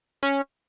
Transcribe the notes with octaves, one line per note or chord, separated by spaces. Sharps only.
C#4